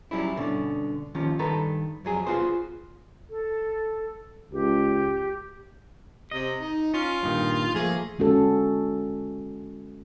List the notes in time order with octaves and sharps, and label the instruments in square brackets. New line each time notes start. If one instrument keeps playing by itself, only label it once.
[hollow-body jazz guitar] F#3 G3 C#4 E4
G2 B2 D3 C#4
D#2 D#3 F3 C#4
G2 D#3 A4 B4 A#5
F2 F#3 G#4
B3 F4 F#4 G#4 C5
[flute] A4
[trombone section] C#2 [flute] G4
[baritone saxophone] C3 [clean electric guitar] D#5
[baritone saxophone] D#4
[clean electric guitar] C#4 [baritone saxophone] F4
[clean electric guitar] G2 A#2 D#3
[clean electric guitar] F3 A3 A#3 [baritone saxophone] G#4
[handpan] D3 G#3 C#4 F#4 A4